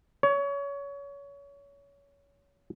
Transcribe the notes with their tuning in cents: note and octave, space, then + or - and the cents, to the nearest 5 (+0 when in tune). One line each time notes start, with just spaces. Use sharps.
C#5 +25